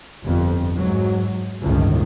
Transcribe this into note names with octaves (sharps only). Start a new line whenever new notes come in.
G1 F2
G#2 F#3
G1 C#2 A2 D#3